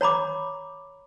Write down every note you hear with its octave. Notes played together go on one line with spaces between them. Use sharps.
C#5 A#5 B5 D6